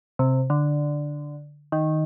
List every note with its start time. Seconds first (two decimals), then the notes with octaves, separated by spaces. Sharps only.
0.19 C3
0.50 D3
1.72 D#3